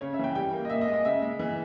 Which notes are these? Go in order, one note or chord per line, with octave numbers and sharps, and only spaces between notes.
C#3 C#5
E5
E3 G5
G3 G5
A#3
D#5
A#2 E5
D#5
G#3
D#5
C#3 E5
G#3
E3